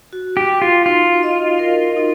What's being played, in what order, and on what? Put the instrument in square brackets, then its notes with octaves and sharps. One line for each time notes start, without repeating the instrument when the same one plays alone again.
[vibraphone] F#4
[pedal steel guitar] G4
[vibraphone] F#4
[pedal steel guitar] F4
[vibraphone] D#4 [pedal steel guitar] F4
[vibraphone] D#5
A#4
D#4